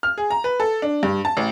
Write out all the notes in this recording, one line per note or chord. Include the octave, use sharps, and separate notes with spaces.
F6
G#4
A#5
B4
A4
D4
G2
A5
A1